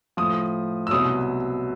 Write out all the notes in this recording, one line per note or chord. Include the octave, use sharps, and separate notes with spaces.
A2 F3 D#6
E6
C2 B2 F#3 D#6